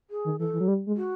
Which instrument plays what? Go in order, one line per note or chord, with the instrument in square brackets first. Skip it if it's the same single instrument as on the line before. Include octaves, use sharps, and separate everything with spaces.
[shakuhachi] G#4
[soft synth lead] D#3
[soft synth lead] E3 [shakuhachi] A4
[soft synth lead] E3
F#3
G3
G#3
[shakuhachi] F#4